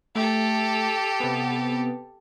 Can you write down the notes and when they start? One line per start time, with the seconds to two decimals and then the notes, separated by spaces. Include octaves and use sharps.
0.15 A3 G4 A4
1.20 C3 B3